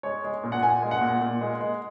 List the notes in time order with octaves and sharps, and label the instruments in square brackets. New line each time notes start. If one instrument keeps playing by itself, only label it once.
[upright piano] G#3 C#5
G#3
A#2
F#5
A#2 G#5
G#3
F#5
A#2
A#2
G#3
G#3